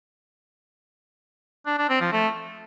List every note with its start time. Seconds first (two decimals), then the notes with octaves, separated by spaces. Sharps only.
1.66 D4
1.78 D4
1.89 C4
2.01 F3
2.12 A3